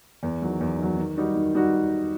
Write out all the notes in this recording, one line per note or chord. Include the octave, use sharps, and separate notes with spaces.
E2
D#3 F#3
E2
D#3 F#3
D#3
G3 D#4 F#4
D#3
G3 D#4 F#4